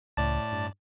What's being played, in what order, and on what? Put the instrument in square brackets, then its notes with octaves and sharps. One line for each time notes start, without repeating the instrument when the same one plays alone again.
[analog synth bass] C#2 [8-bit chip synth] A2 D5 A5
[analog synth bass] G2